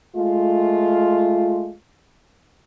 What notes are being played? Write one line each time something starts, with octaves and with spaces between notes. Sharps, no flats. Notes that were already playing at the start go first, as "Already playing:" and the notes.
G#3 A3 F4